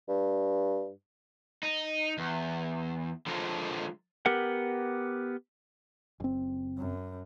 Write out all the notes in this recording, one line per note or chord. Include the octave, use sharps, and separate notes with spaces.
G2
D#4
E2
D3 F3 G#3 F4 A4 A#4
B3 G4 A#4 F#5
F#1 C4
F#2